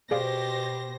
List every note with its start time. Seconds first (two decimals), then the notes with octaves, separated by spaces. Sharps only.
0.11 B2 G4 G#4 C5 D5 F5 A#6